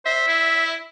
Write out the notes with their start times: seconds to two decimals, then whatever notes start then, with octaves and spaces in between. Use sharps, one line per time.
0.06 C5 E5
0.27 E4